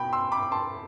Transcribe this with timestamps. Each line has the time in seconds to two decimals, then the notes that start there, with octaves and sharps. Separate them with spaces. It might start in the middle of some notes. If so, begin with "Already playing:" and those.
Already playing: E2 B2 G5 B5
0.13 C6 E6
0.32 B5 D6
0.42 D6
0.52 A5 C6